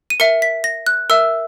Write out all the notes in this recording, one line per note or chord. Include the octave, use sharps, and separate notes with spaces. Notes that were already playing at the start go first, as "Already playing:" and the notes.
D#7
A#4 E5 C#7
B6
A#6
F#6
A#4 E5 E6